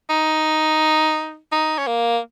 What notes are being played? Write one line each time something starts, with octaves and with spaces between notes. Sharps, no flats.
D#4
D#4
C#4
A#3